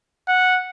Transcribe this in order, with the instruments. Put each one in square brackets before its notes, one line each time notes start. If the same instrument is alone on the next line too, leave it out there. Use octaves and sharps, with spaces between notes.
[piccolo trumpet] F#5